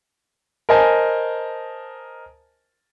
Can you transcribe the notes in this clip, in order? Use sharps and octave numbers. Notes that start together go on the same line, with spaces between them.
A#4 C5 D#5 G#5 A5